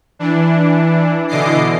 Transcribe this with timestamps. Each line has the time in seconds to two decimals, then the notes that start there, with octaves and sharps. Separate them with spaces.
0.19 E3 D4
1.28 B2 D3 E3 D#5 D6 C7